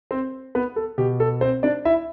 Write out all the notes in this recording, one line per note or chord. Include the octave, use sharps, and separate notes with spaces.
C4 C5
B3 B4
A4
B2 G4
A4
C4 C5
D4 D5
E4 E5